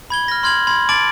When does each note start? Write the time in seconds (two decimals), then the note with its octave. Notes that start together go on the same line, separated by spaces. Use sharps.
0.10 B5 G#6 G7
0.28 F6 A#6
0.43 C6 F6 G#6 F#7
0.67 B5 C6 G#6 F#7
0.89 A5 D6 A6 D7 F#7